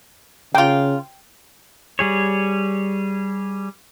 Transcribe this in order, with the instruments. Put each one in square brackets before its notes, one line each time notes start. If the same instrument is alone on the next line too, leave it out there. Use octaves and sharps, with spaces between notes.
[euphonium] C#3 [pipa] A#3 F4 [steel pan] G5
[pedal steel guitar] G3 G#4 C#5